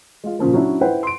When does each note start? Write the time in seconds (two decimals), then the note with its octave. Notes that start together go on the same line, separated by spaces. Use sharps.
0.24 G#3 F4
0.39 A#2 C#3 F3 A#3
0.53 F#3 C#4 D4 E4
0.81 E4 B4 C5 F#5 G5
1.03 C6 D7